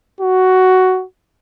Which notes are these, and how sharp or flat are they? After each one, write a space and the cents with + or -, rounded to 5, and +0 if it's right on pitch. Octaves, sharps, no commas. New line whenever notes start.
F#4 +10